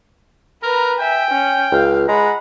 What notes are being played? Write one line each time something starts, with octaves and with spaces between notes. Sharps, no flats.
A#4 B4 A#5
E5 G5 G#5
C#4
C#2 F5
G#3 F#5 A#5 B5